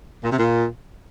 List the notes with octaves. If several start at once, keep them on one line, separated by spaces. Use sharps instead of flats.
A#2
C3
A#2